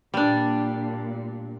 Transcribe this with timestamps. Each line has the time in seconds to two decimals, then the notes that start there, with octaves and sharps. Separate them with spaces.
0.14 A#2 G3 D4